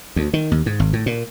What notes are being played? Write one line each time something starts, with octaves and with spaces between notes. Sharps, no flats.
D2
D#3
D#2
G#2
G#1
A2
A#2